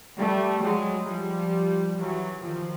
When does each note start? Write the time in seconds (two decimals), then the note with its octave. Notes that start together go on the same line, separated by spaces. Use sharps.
0.18 G3 A3
0.63 F#3 G#3
1.08 F3 G3
1.98 E3 F#3
2.43 D#3 F3